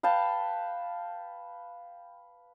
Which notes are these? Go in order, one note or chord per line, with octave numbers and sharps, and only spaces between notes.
B4 F5 G5 A5